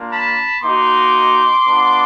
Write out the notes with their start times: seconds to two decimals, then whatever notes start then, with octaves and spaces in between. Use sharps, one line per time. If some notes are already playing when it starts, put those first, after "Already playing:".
Already playing: A#3 D4 F4
0.09 A5 B5
0.62 A#3 D#4 F#4 C6 D6
1.66 B3 D4 F4